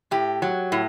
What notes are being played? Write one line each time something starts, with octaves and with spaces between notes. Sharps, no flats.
A2 G4
F#3
A2